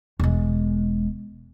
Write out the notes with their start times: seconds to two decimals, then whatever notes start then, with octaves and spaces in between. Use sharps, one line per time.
0.20 E1 G#3